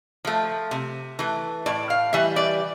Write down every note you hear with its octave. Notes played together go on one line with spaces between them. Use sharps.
F3 A3
C3
E3 A3
A2 D5
F5
E3 G3 E5
D5